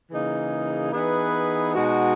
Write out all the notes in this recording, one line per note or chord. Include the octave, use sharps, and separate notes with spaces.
C#3 E3 A#3 D#4 G#4
E3 B3 D#4 G#4 B4
B2 G#3 D#4 F#4